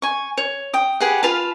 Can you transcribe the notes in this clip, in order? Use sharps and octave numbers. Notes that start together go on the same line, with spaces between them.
G#5 C#6
C#5
G5 D#6
G4 G#4 B4 F#5
F4 B4 F5 A5